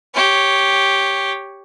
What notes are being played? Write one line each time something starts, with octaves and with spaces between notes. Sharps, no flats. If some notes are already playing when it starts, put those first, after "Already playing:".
G4 C#5